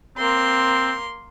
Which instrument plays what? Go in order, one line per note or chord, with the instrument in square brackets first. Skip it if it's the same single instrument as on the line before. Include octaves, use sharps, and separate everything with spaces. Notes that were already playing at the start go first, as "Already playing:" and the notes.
[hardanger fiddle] A#3 C6 [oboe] C4